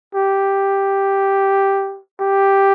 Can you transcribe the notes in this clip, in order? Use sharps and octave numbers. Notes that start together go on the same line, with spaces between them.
G4
G4